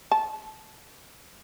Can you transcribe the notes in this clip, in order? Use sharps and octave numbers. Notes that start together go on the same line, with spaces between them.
A5